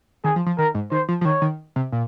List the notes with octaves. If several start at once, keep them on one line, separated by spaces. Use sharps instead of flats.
D#3 G#4
F3
F3
D#3 A#4
G#2
D#3 C5
F3
F3
D#3 C#5
D#3
C3
A#2